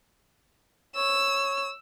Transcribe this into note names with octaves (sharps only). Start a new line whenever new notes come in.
C#5 E6